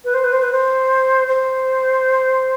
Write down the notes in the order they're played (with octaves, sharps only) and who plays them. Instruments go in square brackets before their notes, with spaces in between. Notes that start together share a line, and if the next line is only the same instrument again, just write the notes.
[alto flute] B4
C5
B4
C5
B4
C5
C5